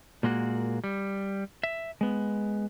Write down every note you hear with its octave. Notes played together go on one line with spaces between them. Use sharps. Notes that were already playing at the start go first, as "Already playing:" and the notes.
A#2 G#3 A#3 F#4
G3
E5
G#3 B3